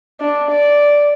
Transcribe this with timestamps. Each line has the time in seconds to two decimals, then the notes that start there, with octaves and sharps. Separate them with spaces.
0.20 D4
0.51 D5